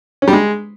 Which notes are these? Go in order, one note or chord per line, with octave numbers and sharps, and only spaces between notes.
C#4
G3
G#3